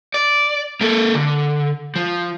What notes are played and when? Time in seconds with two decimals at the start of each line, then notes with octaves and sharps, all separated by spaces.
0.14 D5
0.81 A#3 A4
1.14 D3
1.96 F3